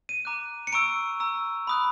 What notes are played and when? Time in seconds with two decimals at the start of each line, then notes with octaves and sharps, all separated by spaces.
0.09 D#7
0.25 A#5 D6 F#6
0.67 C#7
0.72 A#5 C#6 E6 D7
1.20 A#5 C#6 E6
1.67 B5 D#6 F#6